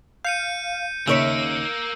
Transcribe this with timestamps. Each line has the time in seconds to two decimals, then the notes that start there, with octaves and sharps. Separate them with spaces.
0.25 F5 G6 C#7 D#7
1.07 D#2 C#3 A#3 C#5 E5 E6 C#7